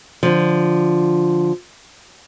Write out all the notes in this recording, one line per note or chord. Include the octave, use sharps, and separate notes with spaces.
D3 F3